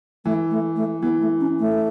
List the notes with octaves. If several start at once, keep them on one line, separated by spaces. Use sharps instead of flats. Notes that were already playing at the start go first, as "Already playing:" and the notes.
E3 A3
A3
A3
E3 B3
A3
C#4
A3